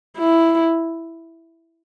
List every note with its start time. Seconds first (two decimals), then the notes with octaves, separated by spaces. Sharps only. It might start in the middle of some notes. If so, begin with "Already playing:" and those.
0.17 E4